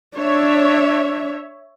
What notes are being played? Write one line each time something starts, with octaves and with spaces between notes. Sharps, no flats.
D4 C#5 E5